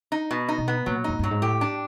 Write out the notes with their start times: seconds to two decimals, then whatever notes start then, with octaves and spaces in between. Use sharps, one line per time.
0.12 D#4
0.31 B2
0.49 D#4
0.58 B2
0.68 B3
0.86 A#2 F#3
1.04 F#2 D#4
1.19 G2 F#3
1.31 G#2
1.42 A2 G4
1.61 D4